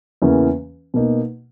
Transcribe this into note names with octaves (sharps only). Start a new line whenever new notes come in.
E2 C#3 E3 A#3 C#4
B2 A#3 D#4